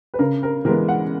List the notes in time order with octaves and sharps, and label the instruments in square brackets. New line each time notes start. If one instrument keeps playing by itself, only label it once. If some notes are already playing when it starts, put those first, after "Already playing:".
[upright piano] B4
C#3 A#4
A#4
E3 G#3 B3 A#4
F#5